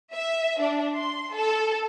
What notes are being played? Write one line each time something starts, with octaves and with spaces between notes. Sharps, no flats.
E5
D4
C6
A4